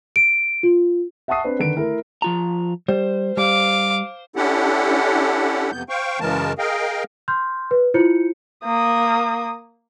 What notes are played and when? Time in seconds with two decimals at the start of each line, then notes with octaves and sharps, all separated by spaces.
0.16 D7
0.63 F4
1.28 E5 F#5 A5 C#6 D#6 C7
1.44 C4 D4 B4
1.59 D3 D#3 B4 D7
1.76 A3 E4 A#4
2.22 F3 F4 A#5
2.88 G3 C5
3.37 G3 F5 D6
4.36 C#4 D4 E4 G4 A4 F#5
5.72 F2 C3 B3 G6
5.89 C5 F5 G5 C#6
6.20 F#2 C#3 E3 G#3 A#4 A5
6.58 G#4 A#4 D#5 F5 G5
7.28 C6 F6 G6
7.71 B4
7.94 E4 F4 C5 G6 C#7
8.65 A#3 D#6